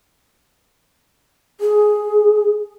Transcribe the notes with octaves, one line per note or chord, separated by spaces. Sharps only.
G#4